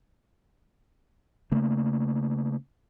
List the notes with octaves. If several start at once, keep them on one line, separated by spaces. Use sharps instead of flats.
C#3 A3 A#3